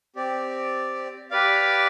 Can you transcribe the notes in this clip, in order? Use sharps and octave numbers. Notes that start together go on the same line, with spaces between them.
C4 G4 D5
G4 B4 D5 F5